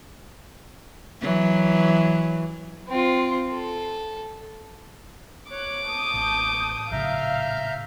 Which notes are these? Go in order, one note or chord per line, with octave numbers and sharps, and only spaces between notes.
E3 F#3
C4 F4
A4
C#5 D6 F#6
A5 C#6 D#6 G6
A1
A#1 A2 C#3 E5 F5 A#5 F6 G6